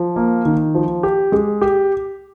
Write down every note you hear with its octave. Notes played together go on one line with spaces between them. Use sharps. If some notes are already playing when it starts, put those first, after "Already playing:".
Already playing: F3
A#3
D#3
F3
G4
G#3
G4